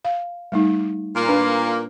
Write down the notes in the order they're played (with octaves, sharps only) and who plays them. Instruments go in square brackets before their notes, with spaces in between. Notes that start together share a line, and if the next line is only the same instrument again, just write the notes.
[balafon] F5
G3 A3 D#4
[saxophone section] A#2 A#3
[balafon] D4 B4